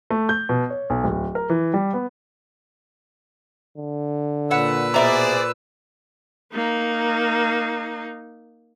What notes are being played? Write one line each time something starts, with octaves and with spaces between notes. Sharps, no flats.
A3
G6
B2
C#5
B1
D1
A#4
E3
G3
B3
D3
A#2 B4 C#5 F#5 E6
B2 G#4 C5 D5 E5 A#5
A#3 D#4